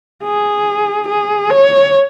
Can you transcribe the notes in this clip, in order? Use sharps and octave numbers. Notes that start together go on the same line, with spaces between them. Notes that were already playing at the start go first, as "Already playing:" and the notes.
G#4
G#4
C#5